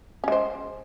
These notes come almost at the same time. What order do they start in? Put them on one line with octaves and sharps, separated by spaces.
C#4 G#3 C5